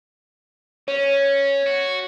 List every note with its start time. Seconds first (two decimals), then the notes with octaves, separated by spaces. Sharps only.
0.88 C#4 C#5
1.67 F#4